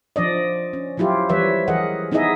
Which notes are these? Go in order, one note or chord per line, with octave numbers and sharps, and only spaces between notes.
F3 D4 D5 D#5
C#4
F3 F#3 E4 F4 G4
E3 F3 G3 B4 C#5 E5
E3 G#4 A#4 D#5 F#5
B3 D#4 E4 G#4 D#5 E5